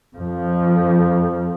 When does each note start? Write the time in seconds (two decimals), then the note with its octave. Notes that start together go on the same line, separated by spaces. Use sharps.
0.16 F2 F3